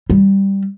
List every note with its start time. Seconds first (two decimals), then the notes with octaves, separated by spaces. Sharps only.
0.10 G3